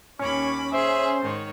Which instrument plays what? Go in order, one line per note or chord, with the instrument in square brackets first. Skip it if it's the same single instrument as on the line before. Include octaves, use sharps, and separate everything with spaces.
[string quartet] D#2 B5 D6 [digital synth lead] C#4 [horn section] C#5
[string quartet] G#4 [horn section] C5 [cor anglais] E5
[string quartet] G#2 D#3 C#5